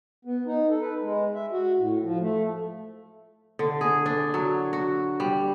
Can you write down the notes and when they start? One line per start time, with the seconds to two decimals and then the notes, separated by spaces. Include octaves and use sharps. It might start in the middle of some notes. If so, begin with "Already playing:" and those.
0.25 B3
0.46 D#4
0.69 A4
0.81 B4
1.02 G#3
1.34 E5
1.52 F#4
1.78 A2
2.03 F3
2.20 A3
3.59 D3
3.81 G#4
4.06 D4
4.34 F#3
4.73 F#4
5.20 G3